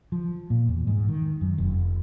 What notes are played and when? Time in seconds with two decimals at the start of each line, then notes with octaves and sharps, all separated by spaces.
0.12 F3
0.50 A#2
0.68 E2
0.87 G#2
1.08 D#3
1.41 F#2
1.58 F1